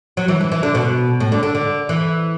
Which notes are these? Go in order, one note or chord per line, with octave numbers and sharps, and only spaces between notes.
F#3
E3
E3
E3
D3
B2
A2
D3
D3
D3
E3